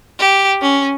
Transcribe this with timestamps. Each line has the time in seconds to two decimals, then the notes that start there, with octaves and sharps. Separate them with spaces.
0.19 G4
0.62 C#4